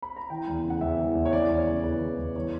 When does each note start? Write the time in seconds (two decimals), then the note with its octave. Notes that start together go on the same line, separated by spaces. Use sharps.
0.02 B5
0.16 A#5
0.30 E3 G5
0.48 E2
0.64 C#3
0.70 F#5
0.81 E2 E5
0.99 E3
1.15 E2
1.25 C#5
1.33 E3 D5
1.49 E2
1.59 C#5
1.67 C#3
1.83 E2 B4
2.02 E3
2.18 E2
2.35 E3 C#5